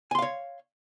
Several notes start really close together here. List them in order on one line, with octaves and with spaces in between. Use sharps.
G#5 C6 F5 C#5